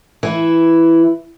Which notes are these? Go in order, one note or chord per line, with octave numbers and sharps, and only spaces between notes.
E3 E4